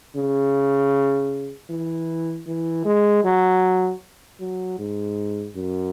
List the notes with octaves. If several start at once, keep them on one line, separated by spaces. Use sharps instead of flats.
C#3
E3
E3
G#3
F#3
F#3
G#2
F#2